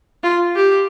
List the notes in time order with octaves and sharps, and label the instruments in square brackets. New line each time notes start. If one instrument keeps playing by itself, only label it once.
[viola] F4
G4